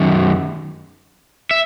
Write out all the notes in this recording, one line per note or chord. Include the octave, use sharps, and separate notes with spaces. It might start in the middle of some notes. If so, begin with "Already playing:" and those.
Already playing: F#2 D#3
E5